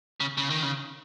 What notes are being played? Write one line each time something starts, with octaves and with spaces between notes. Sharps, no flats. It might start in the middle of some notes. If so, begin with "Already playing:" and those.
C#3
C#3
D#3
C#3